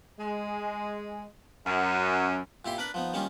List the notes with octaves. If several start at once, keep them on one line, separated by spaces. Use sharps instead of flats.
G#3
F#2
A#2 E4 G4 C6
D4 A#4 B4 B5
F3 B3 D#4
D#3 G3 A#3 C#4 D#4 F4